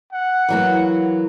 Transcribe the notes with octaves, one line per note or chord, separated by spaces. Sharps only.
F#5
E3 F#3 A#3